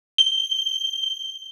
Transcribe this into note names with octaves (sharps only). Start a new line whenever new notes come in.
G7